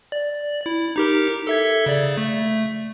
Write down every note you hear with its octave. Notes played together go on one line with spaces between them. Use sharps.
D5
E4
D#4 G4 A#4
A4 E5 G#6
C#3 D5
A3